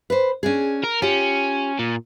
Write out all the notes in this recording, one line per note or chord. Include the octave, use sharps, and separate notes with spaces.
B4 C5
C#4 D4 G#4
A#4
C#4 F4 G4 G5
A#2